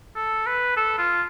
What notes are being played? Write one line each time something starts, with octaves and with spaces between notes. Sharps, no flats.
A4
B4
A4
F4